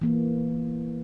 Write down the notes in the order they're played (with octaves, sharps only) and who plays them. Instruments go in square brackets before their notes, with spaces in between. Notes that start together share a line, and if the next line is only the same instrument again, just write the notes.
[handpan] E3 A#3